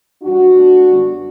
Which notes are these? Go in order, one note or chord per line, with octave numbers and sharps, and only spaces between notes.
F#2 E3 G3 D4 F#4
B2 A3
F#2 D3 G3 B3